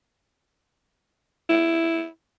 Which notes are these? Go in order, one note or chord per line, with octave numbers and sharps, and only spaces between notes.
E4